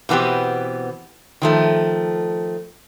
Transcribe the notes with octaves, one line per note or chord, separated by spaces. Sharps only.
B2 E3 B3 C4 G4
D#3 F3 A3